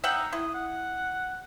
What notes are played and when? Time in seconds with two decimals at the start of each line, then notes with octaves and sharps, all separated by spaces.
0.04 D#4 E5 F#5 G5
0.33 E4 D#6
0.54 F#5